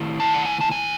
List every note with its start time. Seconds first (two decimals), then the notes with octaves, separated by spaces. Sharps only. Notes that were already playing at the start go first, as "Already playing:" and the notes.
Already playing: D#3 A3 E4
0.20 A5
0.34 F#5
0.45 G#5
0.61 A5
0.71 G#5